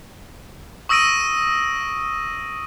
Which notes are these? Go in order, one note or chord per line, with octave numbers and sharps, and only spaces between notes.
C#6 D#6 E6 A#6 D7 D#7